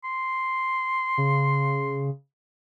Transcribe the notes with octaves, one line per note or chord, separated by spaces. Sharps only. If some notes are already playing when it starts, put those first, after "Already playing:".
C6
C#3